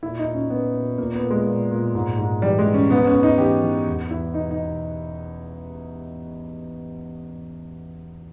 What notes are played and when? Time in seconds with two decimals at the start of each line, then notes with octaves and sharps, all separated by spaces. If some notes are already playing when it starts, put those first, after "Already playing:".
0.03 A#2 E4
0.19 D#4
0.26 A#2
0.34 C#4
0.50 A#2 B3
0.74 A#2
0.98 A#2 A#3
1.15 B3
1.23 A#2
1.31 G#3
1.47 A#2
1.71 A#2
1.95 G#2
2.18 G#2
2.42 E3 G3
2.59 G#3
2.66 E3
2.74 C#4
2.90 G#2 B3
3.07 C#4
3.14 G#2
3.23 D#4
3.38 E3 G4
3.62 E3
3.87 E2
4.10 E2 E4
4.34 B2 D#4
4.51 D#4
4.58 B2